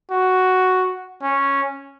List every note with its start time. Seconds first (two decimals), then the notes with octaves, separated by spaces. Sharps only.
0.11 F#4
1.23 C#4